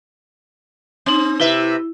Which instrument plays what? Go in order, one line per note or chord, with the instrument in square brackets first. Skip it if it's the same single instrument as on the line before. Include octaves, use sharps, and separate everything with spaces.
[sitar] C4 [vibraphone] D#4 C6
[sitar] C3 B4 E5 [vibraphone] E4